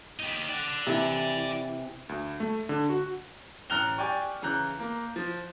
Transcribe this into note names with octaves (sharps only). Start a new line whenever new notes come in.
D#4 G4
D5 F#5
C3 E3
D2
A3
D3
F#4
A1 A#5 F6 F#6 F7 G7
G4 D5 G5 G#5 C#6
C#3 E3 A#5 F#6 G6
A#3
F3